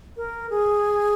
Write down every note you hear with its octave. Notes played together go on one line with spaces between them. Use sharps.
A#4
G#4